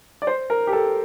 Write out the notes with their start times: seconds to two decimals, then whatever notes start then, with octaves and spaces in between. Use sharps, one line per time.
0.22 D5
0.27 C5
0.50 A#4
0.67 G4
0.73 A4